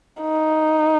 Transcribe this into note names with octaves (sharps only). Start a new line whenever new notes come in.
D#4